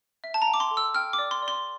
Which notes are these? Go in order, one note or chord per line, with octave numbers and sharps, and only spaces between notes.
E5
A5
A#5
G5
D6
C6
A4
E6
G5 F6
D6
D5
C6
D5
C6